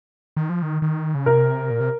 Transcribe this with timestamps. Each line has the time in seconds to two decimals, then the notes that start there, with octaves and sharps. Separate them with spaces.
0.37 D#3
0.50 F3
0.62 D#3
0.82 D#3
1.15 C#3
1.26 C3 A#4
1.71 A#2
1.80 C3